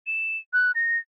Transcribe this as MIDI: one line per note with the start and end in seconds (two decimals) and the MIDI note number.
0.07 0.37 100
0.53 0.71 90
0.75 0.97 94